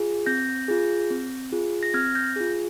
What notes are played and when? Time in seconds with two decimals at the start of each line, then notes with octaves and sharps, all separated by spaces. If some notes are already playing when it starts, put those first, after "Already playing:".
Already playing: F4 G#4
0.26 C4 G6 A#6
0.68 F4 G#4
1.10 C4
1.53 F4 G#4
1.83 A#6
1.94 C4 F6 G#6
2.15 G6 A#6
2.36 F4 G#4